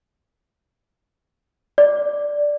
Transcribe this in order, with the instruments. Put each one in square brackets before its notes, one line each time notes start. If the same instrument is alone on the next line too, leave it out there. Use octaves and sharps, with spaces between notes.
[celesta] D5